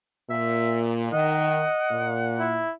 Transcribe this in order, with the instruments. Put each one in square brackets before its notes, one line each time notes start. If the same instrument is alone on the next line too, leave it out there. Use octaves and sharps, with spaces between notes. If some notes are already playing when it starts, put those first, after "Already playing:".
[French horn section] A#2 [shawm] E5
[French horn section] D#3 [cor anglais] D#5 [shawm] F#5
[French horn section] A#2
[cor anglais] E4